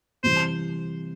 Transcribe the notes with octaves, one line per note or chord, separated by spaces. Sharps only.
C3 E3 G3 C5